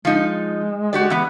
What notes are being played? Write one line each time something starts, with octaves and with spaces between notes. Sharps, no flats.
F3 G#3 D#4
F#4 G4 D5
E3 B3